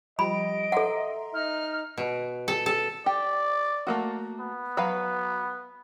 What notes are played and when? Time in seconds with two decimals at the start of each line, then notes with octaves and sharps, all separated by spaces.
0.19 F3 G3 G4 D#5 B5 D7
0.72 A4 E5 F#5 A#5 C6
1.34 D#4 F6
1.98 B2
2.48 A4
2.66 A4
3.06 G4 D5
3.87 A3 A#3 F#4
4.40 B3
4.77 F#3 B4 F5